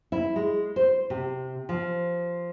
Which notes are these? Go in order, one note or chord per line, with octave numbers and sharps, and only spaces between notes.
E4
G#3
C5
C3
F3